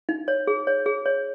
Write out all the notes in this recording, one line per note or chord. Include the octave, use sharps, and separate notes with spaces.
D#4
C#5
G#4
C#5
G#4
C#5